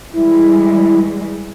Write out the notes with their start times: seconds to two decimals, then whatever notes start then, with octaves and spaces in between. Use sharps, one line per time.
0.13 E3 G3 G#3 E4